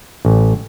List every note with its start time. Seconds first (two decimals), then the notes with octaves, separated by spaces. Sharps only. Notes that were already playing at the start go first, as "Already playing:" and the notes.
0.25 A1